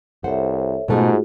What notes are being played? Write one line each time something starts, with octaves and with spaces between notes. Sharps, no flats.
C2 A4 C5 C#5 E5 F#5
G#2 B2 G#3 A3 F4 F#4 G#4